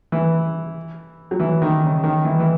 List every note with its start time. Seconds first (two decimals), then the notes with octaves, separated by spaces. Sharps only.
0.12 E3
1.31 F#3
1.40 E3
1.62 D#3
1.83 C#3
2.04 D#3
2.25 E3
2.39 E3